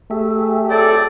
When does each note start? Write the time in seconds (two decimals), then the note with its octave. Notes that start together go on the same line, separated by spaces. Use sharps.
0.11 A3 G4 G#4 E5
0.69 F#3 C4 A4 D5